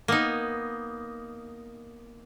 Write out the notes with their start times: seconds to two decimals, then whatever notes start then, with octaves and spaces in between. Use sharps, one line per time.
0.08 A#3 B3 D#4